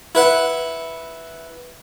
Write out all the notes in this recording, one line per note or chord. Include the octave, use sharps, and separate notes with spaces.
E4 B4 F#5